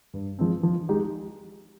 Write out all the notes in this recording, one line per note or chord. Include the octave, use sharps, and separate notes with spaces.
G2
F3 G#3 C4
F3
G#3 D#4 G4